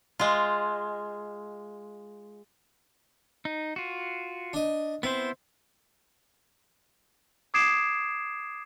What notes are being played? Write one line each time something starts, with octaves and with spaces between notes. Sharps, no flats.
G#3 F4
D#4
F4 F#4
D4 D#5
B3 C4 E4 C5
D6 D#6 G#6 C7 D7 E7